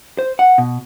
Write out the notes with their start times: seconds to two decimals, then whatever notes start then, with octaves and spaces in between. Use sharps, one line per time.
0.19 C5
0.39 F#5
0.58 B2